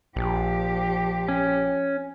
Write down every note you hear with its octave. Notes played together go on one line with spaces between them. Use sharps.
A#1 F3 G4
C#4